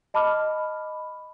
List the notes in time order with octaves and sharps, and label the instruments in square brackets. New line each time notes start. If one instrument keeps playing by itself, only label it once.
[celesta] D#5 A5 B5 D6 F6